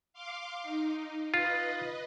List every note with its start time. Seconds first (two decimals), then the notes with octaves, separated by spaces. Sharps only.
0.13 F5 C6 D6
0.62 D#4
1.34 F4 B4 D#5